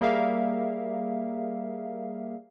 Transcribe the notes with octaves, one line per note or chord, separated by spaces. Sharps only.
G3 A#3 G#4 A#4 E5 F5